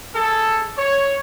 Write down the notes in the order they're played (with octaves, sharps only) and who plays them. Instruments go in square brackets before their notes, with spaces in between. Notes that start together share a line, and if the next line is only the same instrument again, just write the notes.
[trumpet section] G#4 A4
C#5